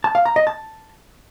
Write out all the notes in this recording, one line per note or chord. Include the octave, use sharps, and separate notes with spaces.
A5
F5
A#5
D#5
A5